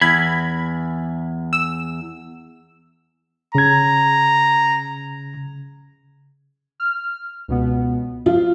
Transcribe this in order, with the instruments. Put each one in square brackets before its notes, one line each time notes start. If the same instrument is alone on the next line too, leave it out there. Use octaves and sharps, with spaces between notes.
[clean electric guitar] E2 [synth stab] B5 G#6
[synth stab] E6
[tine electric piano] C#3 G#6 [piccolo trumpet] A#5
[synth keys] F6
C#2 B2 B3
[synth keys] F3 [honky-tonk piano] F4